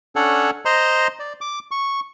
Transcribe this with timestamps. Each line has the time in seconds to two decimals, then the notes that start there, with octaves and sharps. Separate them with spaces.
0.16 C#4 D4 A4 C#5 F#5
0.65 C5 D#5 A#5 C6
1.19 D5
1.41 D6
1.71 C#6